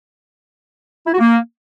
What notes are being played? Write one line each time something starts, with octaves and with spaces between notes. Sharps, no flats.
E4
F#4
A#3